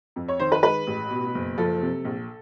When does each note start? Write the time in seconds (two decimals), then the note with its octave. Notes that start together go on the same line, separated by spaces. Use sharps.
0.16 F2
0.28 C#5
0.39 D#3 C5
0.52 B4
0.63 G#3 B4
0.87 A1
1.11 B2
1.35 F#1
1.58 F3 A4
1.82 C3
2.05 A#1